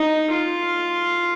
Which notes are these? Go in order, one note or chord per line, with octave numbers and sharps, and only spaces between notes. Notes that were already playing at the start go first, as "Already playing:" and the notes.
Already playing: D#4
F4